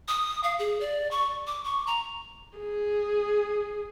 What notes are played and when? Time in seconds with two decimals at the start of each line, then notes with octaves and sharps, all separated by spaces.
0.08 D#6
0.44 F5
0.59 G#4
0.81 D5
1.11 C#6
1.47 D6
1.64 C#6
1.87 A#5
2.58 G#4